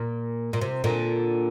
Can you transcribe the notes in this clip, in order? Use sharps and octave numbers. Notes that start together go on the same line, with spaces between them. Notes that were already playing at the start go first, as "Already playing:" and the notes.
Already playing: A#2
A#2
C3
A#2 D3